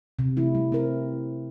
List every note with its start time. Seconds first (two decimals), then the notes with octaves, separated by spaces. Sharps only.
0.19 C3
0.37 E3 A3 E4
0.55 G3
0.72 C4 E4 A#4